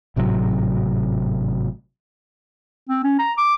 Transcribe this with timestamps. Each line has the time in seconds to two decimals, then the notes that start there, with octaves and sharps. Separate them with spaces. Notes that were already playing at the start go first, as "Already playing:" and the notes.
0.16 G#1 A2 C3 F#3
2.89 C4
3.04 C#4
3.19 A#5
3.38 D6